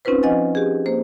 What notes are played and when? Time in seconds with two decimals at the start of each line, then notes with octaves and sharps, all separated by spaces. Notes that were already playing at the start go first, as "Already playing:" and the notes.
0.05 C4 C#4 D#4 F4 B4 C5
0.23 F3 D#5 F#5 G#5 A6
0.55 G4 G#4
0.86 A#3 C5